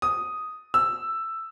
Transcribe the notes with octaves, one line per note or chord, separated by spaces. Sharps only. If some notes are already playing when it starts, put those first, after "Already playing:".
D#6
E6